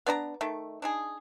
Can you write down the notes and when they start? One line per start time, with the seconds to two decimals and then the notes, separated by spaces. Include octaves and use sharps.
0.06 B3 D4 D5 A#5
0.41 D#3 A3
0.82 D4 D#4 G#4